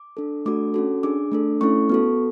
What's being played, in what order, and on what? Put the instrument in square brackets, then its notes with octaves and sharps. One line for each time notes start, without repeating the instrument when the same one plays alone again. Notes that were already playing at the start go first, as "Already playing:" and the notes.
Already playing: [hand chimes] D6
D4 A4
A3 D4 F#4 A4 D6
C#4 F#4 A4
D4 G#4 D6
A3 D4 A4
A3 C#4 E4 A4 C#6
B3 F#4 A4